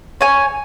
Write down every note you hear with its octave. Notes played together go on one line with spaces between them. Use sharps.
C#5 G#5